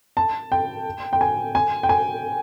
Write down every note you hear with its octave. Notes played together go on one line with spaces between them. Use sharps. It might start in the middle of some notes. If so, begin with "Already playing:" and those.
A5
G5
G5
G#5
G#5
G5
G#5